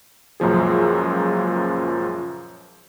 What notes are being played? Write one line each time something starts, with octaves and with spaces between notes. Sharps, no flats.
C#2 F#2 A#2 F3 G#4